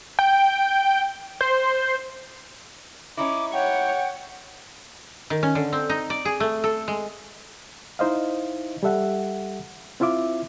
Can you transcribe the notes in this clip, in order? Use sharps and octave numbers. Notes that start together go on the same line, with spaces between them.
G5
C5
C#4 D#4 E4 D6
C#5 F#5 G5
D#3
C#4
D3
C4
D#4
D5
G#4
A3
A4
G#3
D#4 E4 C5 D#5 F5
G3 G4 A4 E5 F#5
C4 E4 F4 E5 D6